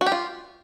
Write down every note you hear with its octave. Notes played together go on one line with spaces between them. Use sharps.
F#4
G4
F4